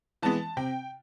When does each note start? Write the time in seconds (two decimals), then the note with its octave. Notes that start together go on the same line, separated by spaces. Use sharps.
0.22 E3 G#3 B3 A5
0.57 C3 G5